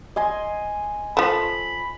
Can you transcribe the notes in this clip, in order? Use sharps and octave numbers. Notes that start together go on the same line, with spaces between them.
D#5 G#5 C6
F3 A3 B5